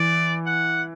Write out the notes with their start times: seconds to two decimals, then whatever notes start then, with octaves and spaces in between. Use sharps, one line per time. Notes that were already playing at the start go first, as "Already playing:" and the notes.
Already playing: E3 D5
0.46 F#5